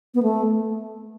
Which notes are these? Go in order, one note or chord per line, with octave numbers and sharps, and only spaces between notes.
B3
A3